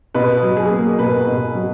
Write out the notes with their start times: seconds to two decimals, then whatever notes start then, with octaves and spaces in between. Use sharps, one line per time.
0.14 B2 B4
0.43 F#3
0.57 G#4
0.71 A#3
0.99 B2 B4
1.27 B2
1.55 F#3